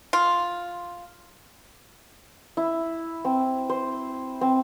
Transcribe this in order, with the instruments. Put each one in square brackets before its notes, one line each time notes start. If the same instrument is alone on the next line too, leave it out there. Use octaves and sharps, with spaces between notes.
[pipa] F4
[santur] E4
C4
C5
C4